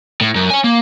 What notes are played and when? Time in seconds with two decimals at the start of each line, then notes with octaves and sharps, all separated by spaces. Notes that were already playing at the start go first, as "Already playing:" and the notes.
0.21 A2
0.35 F#2
0.50 C#5 G#5
0.64 A#3